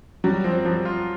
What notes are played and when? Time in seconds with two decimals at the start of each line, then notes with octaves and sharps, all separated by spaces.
0.24 F#3 G3
0.44 F3 C4
0.65 F3 G3
0.85 F4